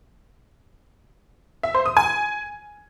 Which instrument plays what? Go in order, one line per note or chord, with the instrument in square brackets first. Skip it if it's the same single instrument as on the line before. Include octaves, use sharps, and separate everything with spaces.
[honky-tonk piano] E5
C5
D#6
G#5